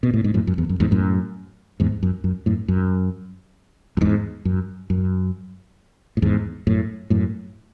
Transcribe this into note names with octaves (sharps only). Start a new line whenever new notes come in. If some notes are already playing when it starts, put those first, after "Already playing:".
B2
A2
G#2
F#2 A2
F#2
E2
F#2
E2 G#2
F#2 A2
E2 G#2
F#2
F#2
F#2 A2
F#2
F#2
E2 G#2
F#2
F#2
A2
E2 G#2
F#2 A2
F#2 A2